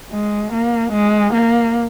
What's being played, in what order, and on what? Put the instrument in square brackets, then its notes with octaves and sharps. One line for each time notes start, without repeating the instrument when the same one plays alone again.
[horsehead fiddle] G#3
A#3
G#3
A#3